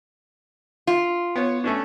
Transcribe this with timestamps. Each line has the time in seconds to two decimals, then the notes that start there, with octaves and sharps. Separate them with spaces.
0.87 F4
1.36 B3 C#5
1.64 A3 C#4 D4